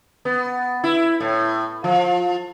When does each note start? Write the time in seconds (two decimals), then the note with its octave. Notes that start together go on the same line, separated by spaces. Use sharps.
0.25 B3
0.84 E4
1.20 A2
1.84 F3